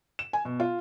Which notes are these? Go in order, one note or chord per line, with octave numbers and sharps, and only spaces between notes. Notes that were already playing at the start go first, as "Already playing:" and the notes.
E7
G#5
B2
F4